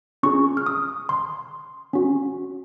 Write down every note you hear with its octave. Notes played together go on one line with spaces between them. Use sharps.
C#4 F4 G#4 C#6
F6
D#6
C6
C#4 F#4